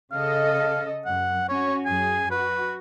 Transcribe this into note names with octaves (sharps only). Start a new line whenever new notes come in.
C#3 A4 D#5 F5
F#2 F#5
C#4 F#4 C#5
F#2 G#4 G#5
F#4 B4